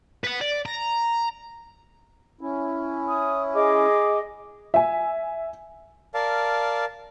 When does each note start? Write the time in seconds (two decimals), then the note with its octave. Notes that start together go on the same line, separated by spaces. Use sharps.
0.24 B4 F#5
0.41 D5
0.66 A#5
2.41 C#4 E4
3.08 D#6
3.53 G#4 D#5 D6
4.74 E5 G#5
6.14 A#4 D5 F5 A5